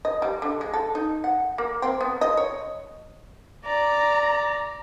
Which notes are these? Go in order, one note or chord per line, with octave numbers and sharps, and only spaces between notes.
D#5
G3
D3
G#3
A4
D#4
F#5
A#3
C4
B3
D#5
C#5
D5 A#5